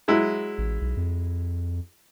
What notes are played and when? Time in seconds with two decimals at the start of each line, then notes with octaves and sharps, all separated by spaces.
0.08 F#3 G#3 E4
0.58 A1
0.81 B1
0.97 F2